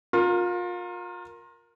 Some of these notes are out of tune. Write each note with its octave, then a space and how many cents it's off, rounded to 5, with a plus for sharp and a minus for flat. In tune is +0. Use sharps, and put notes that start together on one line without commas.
F4 +30 A#4 +0